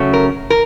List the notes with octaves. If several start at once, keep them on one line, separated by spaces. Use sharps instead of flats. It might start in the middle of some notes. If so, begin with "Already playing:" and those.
Already playing: C#3 F#3 A3 C#4
A#4
A#4